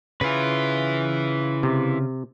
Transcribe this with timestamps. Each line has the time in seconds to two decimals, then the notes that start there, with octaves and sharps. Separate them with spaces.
0.21 C#3 E4 F4 B4
1.63 C3